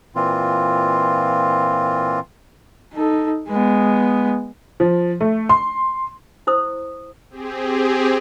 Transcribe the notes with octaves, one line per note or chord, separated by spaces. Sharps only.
A#2 E3 C4 F4
D#4 A4
G#3 B3
F3
A3
C6
E4 C5 D#6
C4 G4 G#4